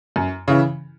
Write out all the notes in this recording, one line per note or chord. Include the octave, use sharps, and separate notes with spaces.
F#2
C#3 E3